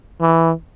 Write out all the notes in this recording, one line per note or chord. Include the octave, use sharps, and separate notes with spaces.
E3